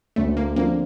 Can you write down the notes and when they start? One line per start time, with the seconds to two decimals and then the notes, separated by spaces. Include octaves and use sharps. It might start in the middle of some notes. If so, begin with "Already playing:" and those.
0.16 D2 A3
0.37 A#3
0.56 D3 F3 A#3 C4